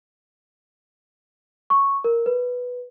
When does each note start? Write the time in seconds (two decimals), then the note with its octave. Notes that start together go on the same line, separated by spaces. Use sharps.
1.70 C#6
2.04 A#4
2.26 B4